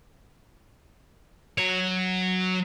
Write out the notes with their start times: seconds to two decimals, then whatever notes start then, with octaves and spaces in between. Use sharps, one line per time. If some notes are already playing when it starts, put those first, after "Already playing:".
1.58 F#3 C#5